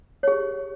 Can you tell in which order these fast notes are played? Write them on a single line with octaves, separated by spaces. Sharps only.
C#5 G#4 G4